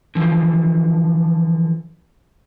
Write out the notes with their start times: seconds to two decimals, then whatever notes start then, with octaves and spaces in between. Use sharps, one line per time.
0.15 D3 E3 F3